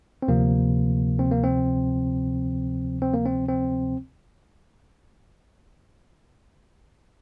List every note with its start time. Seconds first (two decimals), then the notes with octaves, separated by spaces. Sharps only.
0.22 C4
0.28 D2 C3 F3 A#3
1.19 C4
1.31 A#3
1.44 C4
3.02 C4
3.14 A#3
3.26 C4
3.48 C4